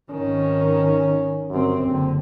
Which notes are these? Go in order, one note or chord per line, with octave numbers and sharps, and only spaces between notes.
G#1 D#3 C#4
G1 F#2 C4
F#1 D3 C4